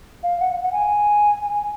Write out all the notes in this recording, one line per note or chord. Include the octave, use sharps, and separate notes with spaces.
F5
F#5
F#5
G#5